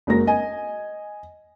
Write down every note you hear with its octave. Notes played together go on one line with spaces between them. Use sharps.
F#1 G#3 F#4 A#4 A#6
D#5 G#5